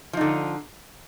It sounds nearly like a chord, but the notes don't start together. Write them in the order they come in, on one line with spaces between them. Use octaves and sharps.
F3 D#4 D3